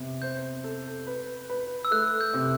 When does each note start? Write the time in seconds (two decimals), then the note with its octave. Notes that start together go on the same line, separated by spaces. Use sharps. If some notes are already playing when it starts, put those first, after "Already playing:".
Already playing: C3 B3
0.22 C5 G6
0.64 A4
1.07 B4
1.50 B4
1.85 E6
1.91 A3 F#6
2.21 G6
2.34 C3